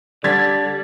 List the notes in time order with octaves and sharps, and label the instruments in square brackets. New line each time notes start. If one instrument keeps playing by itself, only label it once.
[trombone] D3 [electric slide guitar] G3 [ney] D5 [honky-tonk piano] G#6 A6 B6